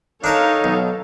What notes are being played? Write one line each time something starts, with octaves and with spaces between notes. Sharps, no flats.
D4 D#4 A4 A#4 C#5 F5 A5
B1